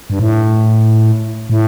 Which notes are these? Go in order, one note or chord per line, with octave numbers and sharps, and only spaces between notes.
G2
A2
A2